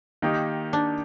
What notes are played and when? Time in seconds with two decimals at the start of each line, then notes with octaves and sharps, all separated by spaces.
0.22 D#3 A#3 D#4 G4
0.73 D4